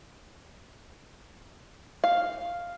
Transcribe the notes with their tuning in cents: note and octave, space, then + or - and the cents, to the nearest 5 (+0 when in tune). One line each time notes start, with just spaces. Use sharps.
F5 +0